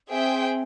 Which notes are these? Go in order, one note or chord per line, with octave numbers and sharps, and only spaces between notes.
C4 G#4 C5 E5 G5